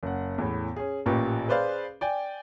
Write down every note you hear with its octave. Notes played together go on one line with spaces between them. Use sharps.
F#1 F#5
E2 A2
C#4 G#4
A1 A#2 A#3 G4 B4 C#6
G#4 B4 C5 D5 F5
D5 G5 G#5